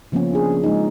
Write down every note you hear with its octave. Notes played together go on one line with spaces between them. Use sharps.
C#3 F3 A#3 B3 C#4
D4 G#4
G#3 D#4